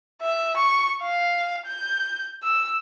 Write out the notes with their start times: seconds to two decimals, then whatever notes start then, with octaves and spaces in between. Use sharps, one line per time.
0.22 E5
0.57 C#6
1.03 F5
1.67 G6
2.43 E6